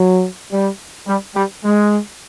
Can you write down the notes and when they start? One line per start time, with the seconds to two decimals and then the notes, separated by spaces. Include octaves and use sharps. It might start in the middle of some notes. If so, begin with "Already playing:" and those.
Already playing: F#3
0.51 G3
1.07 G3
1.35 G3
1.64 G#3